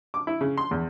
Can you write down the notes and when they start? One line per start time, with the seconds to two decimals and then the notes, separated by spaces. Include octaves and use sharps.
0.14 D6
0.27 E4
0.41 C#3
0.58 C6
0.71 E2